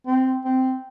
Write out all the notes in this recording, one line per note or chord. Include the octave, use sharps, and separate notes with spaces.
C4
C4